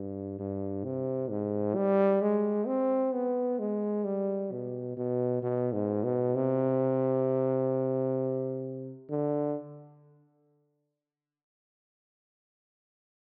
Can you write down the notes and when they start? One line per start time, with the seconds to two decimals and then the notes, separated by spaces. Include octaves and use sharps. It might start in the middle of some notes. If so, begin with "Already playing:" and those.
Already playing: G2
0.39 G2
0.85 C3
1.30 G#2
1.75 G3
2.22 G#3
2.67 C4
3.14 B3
3.59 G#3
4.05 G3
4.52 B2
4.97 B2
5.43 B2
5.73 G#2
6.04 B2
6.35 C3
9.10 D3